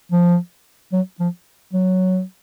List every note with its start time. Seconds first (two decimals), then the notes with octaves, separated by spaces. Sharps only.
0.12 F3
0.93 F#3
1.20 F3
1.73 F#3